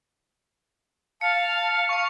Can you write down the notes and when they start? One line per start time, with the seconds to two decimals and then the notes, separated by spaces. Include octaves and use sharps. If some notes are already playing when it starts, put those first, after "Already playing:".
1.21 F5 A5 C#7
1.43 F7
1.89 C#6 C#7